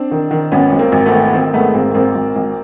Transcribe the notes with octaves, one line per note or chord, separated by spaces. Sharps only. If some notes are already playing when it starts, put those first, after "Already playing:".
Already playing: C4 D4
D#3
D#3
G#1 B3 C#4
G#1
A#3 C4
G#1
A3 B3
D#3
B3
D#3 A#3 C4
G#2 A3 B3
G#1 A#3 C4
G#1 A#3 C4
G#1
G#1